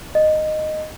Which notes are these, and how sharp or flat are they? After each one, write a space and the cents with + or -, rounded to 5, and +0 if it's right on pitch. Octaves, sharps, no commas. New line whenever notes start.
D#5 -10